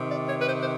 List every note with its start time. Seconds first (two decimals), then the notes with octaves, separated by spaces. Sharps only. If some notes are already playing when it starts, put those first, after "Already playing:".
Already playing: C3 D#3
0.09 D5
0.28 C#5
0.40 B4
0.46 C5
0.59 C5